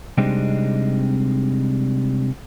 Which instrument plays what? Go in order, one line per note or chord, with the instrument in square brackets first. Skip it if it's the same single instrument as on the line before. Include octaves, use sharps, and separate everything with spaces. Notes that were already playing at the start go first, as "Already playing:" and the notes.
[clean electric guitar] C3 G3 G#3 C4 D4 D#4